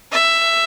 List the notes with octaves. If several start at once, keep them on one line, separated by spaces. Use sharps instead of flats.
E5